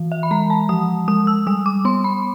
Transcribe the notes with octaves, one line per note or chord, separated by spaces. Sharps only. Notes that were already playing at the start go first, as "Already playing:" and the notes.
Already playing: E3
E5
B5
G#3 A#5
A5
F3 D#6
G#3 D#6
E6
G3 D#6
D6
B3 C6
B5